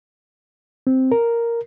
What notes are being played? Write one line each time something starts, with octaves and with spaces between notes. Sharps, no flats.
C4
A#4